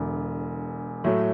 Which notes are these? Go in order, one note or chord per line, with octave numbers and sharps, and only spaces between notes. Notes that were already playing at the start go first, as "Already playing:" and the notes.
Already playing: E1 E2 D3
A2 F#3 A3